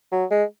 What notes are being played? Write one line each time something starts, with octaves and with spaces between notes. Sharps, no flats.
F#3
G#3